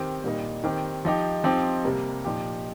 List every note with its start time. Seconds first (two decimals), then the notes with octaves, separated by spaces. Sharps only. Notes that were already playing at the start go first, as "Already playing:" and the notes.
Already playing: D#3 C4 G4
0.24 A#2 G3 A#3 D#4
0.64 D#3 C4 G4
1.05 F3 D#4 G4
1.44 F3 C4 D#4 G4
1.85 C3 G3 A#3
2.24 A#2 F3 D#4 G4